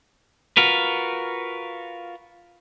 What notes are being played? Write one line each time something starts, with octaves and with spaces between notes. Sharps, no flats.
F4 F#4 A#4 B4